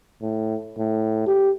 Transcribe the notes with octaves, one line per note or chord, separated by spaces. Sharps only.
A2
A2
G4